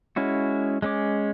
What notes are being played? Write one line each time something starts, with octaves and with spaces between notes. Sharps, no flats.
G#3 C#4 E4 F#4
G#3 C#4 D6